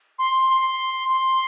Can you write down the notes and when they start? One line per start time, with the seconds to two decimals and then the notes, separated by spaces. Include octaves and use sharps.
0.19 C6
0.50 C6
1.09 C6